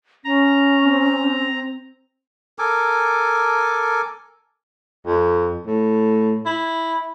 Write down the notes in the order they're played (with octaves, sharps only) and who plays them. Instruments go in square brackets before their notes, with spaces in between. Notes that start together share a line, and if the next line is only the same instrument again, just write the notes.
[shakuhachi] C#4 [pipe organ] A#5
[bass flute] C4
[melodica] A4 A#4 G#5 D6
[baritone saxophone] F2
A2
E4